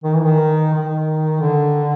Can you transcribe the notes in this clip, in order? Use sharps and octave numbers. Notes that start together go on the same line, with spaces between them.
D#3
E3
D#3
D#3
D3